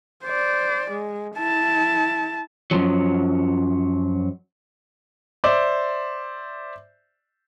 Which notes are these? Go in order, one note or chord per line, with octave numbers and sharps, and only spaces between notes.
C5 D5
G#3
E4 A5
F#2 B2 F3 F#3
C5 D5 E5 D6